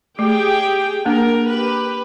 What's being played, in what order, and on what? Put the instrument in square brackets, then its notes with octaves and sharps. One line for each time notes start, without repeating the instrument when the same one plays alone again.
[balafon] A3 [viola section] G4 G#4 G5
[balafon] A#3 D4 [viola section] A#4
[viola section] G4 B4